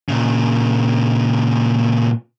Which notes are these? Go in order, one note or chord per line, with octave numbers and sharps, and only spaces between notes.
A#2 C#3